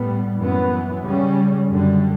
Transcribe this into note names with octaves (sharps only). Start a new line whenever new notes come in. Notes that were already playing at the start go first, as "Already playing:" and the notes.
Already playing: A2 G3 B3
F#2 E3 B3
C#3 G3 C#4
F#2 D3 G3